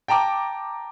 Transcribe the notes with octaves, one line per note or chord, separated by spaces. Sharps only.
G5 A5 A#5 D6